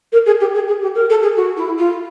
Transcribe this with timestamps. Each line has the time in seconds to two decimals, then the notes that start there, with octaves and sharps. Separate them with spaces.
0.12 A#4
0.26 G#4
0.40 G4
0.54 G#4
0.68 G#4
0.82 G4
0.95 A#4
1.10 A4
1.22 G#4
1.36 F#4
1.57 E4
1.78 F4